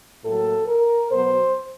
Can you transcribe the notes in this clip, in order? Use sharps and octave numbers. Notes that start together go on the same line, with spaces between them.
A2 F#3 A#3 A4
A#4
B2 F#3 B3 C5